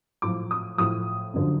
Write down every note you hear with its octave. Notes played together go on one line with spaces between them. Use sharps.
A2 F3 D6
D#6
A2 F3 D#6
F#2 D3 F3